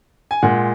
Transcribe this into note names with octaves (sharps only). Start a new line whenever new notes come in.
G#5
A#2 G#3 F#5